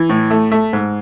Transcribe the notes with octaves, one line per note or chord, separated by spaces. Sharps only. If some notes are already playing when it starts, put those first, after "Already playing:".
Already playing: E3
A2
A3
A3
G#2